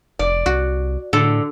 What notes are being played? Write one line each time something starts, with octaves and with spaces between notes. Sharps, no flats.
F1 D5
C2 F#4
A2 D3 A4